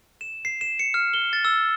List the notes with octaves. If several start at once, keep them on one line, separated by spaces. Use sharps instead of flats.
E7
C7
E7
C#7
F6
G7
A6
E6